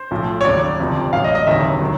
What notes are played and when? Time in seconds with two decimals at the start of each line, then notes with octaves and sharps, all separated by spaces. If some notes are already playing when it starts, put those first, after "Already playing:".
Already playing: C5
0.11 B1 A2 F3
0.41 C#5
0.45 D#2 C#3 F#3 D5
0.80 G1 F2 C3 F3
1.13 A1 A2 F#3 F5
1.24 D#5
1.35 D#5
1.47 E1 D2 C3 D#3 F#3 E5
1.81 D#3 F#3